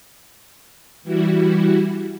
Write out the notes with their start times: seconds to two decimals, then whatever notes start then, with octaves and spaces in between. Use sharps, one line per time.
1.03 E3 G3 E4 F#4